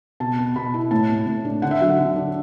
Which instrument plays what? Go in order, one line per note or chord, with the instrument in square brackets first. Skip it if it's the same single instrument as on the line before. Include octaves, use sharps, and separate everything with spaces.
[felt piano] B2 A5
B3
B2 B5
E4
A2 A5
A3
A2
D4
D3 F#5
E5
F#3 F#5
D3
D4